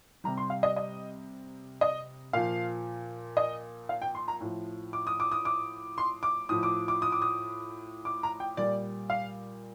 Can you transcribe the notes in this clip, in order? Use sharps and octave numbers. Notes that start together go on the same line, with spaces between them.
C3 G3 A#5
C6
F5
D#5
D#5
D#5
A#2 F3 F5
D#5
F5
G5
C6
A#5
A2 F3
D6
D#6
D6
D#6
D6
C6
D6
A2 F3 D#6
D6
D6
D#6
D6
D#6
D6
A#5
G5
A#2 G3 D5
F5